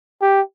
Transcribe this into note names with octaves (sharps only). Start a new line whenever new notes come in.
G4